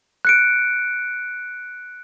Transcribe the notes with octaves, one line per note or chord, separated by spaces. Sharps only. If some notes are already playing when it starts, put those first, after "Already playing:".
F#6 C#7 D7